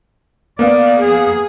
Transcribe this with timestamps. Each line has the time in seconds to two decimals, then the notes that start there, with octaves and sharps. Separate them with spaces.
0.59 A#3 B3 D5 F5
1.01 G#4